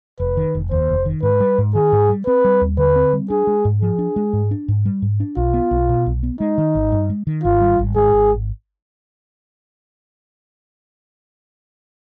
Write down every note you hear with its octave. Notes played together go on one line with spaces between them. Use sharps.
F1 B4
D#3
F1
D#2 C5
F1
D#3
G#2 B4
G3
G#2
D#3 G#4
G#2
G3
C4 B4
G3
D#2
D3 B4
C4
G3
D4 G#4
G#3
G#2
F3 G#4
D4
G#3
G#2
D4
G#2
G3
G#2
D4
B1 F4
B3
B1
B2
B1
B3
G#3 D#4
D#3
G#1
G2
G#3
D#3
G#1 F4
G3
G#1
G#2 G#4
G#1